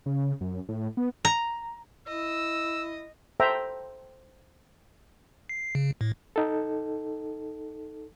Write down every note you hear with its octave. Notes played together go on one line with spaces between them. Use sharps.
C#3
F#2
A2
B3
A#5
E4 D#5 E6
A4 C5 E5 G5 A#5
C7
C#3
A2
D#4 A4